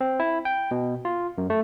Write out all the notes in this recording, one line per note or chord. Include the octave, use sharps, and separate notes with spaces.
C4
E4
G5
B2
F4
F#2
A3